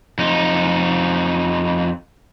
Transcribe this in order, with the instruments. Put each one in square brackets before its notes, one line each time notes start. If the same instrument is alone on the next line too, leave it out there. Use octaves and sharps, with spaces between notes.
[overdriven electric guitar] F2 D#4